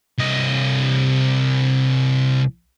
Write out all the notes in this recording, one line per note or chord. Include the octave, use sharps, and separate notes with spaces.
C2 D#5